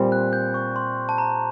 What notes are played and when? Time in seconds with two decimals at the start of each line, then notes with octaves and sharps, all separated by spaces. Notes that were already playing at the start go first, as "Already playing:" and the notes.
Already playing: A#2 G3 C4
0.12 F#6
0.33 G6
0.54 C#6
0.76 C6
1.09 A5
1.18 A#5